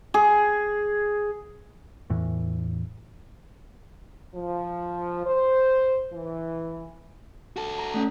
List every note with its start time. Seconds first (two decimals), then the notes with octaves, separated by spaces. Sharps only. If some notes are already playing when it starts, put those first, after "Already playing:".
0.14 G#4
2.10 E2 A2 E3
4.35 F3
5.26 C5
6.12 E3
7.56 F#4 A4
7.79 A#5
7.94 A3 C#4